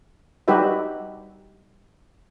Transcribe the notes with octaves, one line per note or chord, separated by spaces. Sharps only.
G3 D#4 F#4 G4 B4 E5